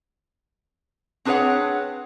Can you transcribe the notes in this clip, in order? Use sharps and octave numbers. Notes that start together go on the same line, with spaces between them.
C4 D4 G#4 B4 C#5 F#5